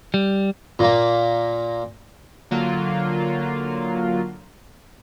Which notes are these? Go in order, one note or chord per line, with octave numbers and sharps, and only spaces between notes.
G3
A#2 A#3
D3 F#3 A#3 F4